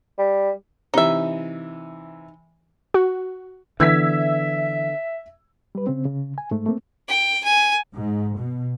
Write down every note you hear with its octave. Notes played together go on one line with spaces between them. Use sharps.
G3
C3 E3 D#4 E5
F#4
D3 E3 B3 E5 E6 G#6 B6
G3 B4
C#3 C4
C#3
G#5
G#2 A3
A3 A#3 C4
G5
G#5
G#2
B2